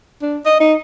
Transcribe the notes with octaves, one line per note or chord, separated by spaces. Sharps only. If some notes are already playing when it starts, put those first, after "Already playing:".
D4
D#5
D#4